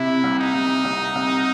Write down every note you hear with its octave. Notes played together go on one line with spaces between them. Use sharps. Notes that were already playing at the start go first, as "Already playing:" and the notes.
Already playing: C3 E4
C2
D#4
C2
C2
C2